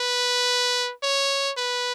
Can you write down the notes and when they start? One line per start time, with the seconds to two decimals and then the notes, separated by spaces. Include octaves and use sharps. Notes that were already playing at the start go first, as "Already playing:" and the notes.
Already playing: B4
1.03 C#5
1.57 B4